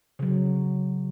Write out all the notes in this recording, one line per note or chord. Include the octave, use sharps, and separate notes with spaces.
C#3 F#3